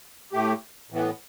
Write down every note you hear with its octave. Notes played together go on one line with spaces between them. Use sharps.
A2 A3 G4
A2 E3 B3